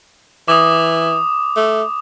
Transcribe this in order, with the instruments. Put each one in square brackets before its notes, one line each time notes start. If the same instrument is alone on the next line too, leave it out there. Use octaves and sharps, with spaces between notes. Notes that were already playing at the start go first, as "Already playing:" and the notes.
[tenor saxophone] E3 [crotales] D6 D#6
[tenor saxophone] A3